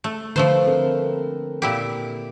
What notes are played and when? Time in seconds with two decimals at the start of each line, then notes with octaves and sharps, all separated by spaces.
0.04 A3
0.36 D3 F3 A3 B4 C5
0.67 C4 A4 A#4
1.62 A#2 E4 G4